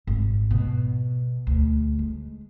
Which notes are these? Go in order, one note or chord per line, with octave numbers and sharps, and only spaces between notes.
G#1
B2
D2
G#3